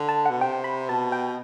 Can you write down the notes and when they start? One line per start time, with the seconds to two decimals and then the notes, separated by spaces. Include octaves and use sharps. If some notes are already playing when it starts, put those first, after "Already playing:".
Already playing: D3
0.09 A5
0.26 B2 F#5
0.41 C3 G5
0.64 B5
0.89 B2 A5
1.12 G5